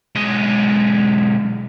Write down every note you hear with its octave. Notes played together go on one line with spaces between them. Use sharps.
B1 G#3